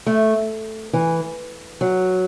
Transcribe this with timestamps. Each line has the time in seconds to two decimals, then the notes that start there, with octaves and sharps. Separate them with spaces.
0.06 A3
0.93 E3
1.81 F#3